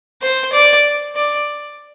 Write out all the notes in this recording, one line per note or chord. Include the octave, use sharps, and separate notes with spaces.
C5
D5
D5